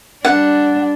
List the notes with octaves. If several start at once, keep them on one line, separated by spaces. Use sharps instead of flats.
G3 D4 F#5